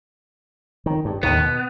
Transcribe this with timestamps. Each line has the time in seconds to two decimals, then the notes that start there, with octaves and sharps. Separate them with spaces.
0.86 D#3
1.05 G2
1.23 D#2 A2 D#3 B3
1.38 B2